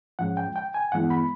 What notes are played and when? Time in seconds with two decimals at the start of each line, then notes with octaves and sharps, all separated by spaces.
0.19 G#2 F3 G#3 C#4 F#5
0.37 G5
0.56 G5
0.74 G#5
0.92 G2 E3 G#3 B3 E4 F#5
1.10 B5